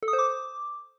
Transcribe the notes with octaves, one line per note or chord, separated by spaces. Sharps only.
A4
D#6
C5
D6